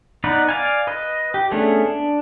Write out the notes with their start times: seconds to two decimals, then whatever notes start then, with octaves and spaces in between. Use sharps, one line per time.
0.24 B3 D#4 B4 D5
0.49 D5 F5 G#5
0.87 B4 D#5
1.34 G4
1.51 A3 B3 C#4 D4 G#4
1.86 D4